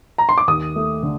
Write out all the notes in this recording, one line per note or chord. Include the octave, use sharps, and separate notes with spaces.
A#5
C6
D6
D#2 D#6
A3
D3